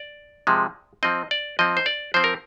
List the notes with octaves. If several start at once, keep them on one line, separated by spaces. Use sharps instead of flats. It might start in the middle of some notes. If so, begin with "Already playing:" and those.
Already playing: D5
C3 F3 G#3
F3 C4 D#5
D5
F3 C4 D#5
C5
D5
F3 C4 C5
A#4